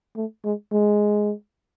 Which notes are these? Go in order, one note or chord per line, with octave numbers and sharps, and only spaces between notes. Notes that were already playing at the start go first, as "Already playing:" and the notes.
A3
G#3
G#3